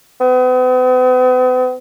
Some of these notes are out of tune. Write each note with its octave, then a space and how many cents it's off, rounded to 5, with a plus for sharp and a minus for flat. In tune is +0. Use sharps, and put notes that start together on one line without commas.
B3 +45